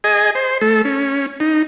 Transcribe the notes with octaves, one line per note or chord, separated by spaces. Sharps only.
G#4 D#5 G#5
C5
A3 A4
C#4
D#4